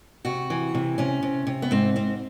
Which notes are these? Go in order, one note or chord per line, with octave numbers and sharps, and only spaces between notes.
C3 F#4
E3
C3
C3 C#4
C3
C3
B3
G#2 C4
G#2 C4